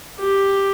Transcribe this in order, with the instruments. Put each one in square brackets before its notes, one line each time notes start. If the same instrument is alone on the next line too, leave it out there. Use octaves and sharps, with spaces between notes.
[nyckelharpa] G4